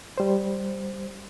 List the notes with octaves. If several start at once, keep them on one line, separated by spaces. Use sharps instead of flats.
G3 C5